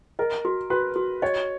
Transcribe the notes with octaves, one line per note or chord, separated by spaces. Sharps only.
A#4 D#5
F#4
F#4 B4
F#4
C#5 D#5